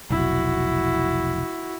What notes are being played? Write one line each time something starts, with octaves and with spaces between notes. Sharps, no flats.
F1 B1 E4 F#4